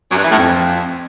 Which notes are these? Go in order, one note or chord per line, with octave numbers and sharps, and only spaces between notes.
F#2
G2
E3
A2
F2